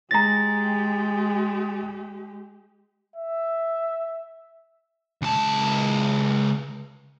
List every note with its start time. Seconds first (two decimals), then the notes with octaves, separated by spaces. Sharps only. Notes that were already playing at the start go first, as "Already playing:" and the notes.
0.11 G#3 G4 A#5 A6 A#6
3.16 E5
5.22 C#2 A5